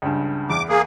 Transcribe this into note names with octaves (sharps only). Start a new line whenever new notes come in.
C#2 G2
E2 D6
A#3 G#4